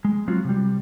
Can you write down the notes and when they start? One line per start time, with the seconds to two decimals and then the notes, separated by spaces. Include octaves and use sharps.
0.05 G#3
0.28 F#3 C4 F4 F#4
0.45 C3 G3